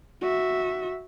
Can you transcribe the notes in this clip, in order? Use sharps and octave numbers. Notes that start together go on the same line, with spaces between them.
F#4 E5